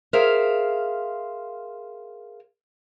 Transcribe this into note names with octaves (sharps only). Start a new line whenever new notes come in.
G#4 A#4 C5 E5 F5